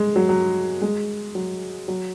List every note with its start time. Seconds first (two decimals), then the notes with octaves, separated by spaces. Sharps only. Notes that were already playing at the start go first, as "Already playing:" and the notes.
Already playing: G#3
0.16 F#3
0.29 F#3
0.81 G#3
1.35 F#3
1.88 F#3